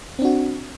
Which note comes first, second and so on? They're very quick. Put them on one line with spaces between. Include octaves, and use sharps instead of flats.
C4 D4 F#4